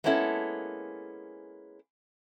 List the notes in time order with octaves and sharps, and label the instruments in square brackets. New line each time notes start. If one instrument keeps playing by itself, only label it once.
[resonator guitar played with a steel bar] G#3 A#3 B3 C#4 E4 A4